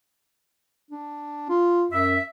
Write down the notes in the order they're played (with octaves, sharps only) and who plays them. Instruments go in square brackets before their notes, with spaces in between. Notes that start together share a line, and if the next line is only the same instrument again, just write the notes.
[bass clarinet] D4
F4
[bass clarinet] F#2 [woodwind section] E5